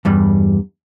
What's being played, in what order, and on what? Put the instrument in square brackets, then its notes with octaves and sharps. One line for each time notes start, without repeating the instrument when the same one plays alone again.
[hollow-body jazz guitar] E2 G2 G3